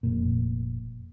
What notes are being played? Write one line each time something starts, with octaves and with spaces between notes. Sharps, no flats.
F1 A#2